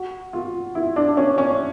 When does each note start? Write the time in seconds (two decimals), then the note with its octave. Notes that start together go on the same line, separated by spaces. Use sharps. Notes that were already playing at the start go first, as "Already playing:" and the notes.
Already playing: F#4
0.33 F4
0.75 E4
0.96 D4
1.17 C#4
1.38 C#4